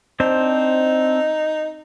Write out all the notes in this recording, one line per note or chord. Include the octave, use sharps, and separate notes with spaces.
C4 D4 D#4 C5